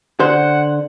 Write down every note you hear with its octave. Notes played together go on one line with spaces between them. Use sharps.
D3 C5 F#5